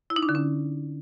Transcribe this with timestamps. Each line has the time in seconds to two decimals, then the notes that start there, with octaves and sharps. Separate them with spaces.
0.10 E4
0.16 D#4
0.23 D4
0.29 D3
0.35 C#4